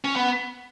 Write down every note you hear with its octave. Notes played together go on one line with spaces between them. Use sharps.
C#4
B3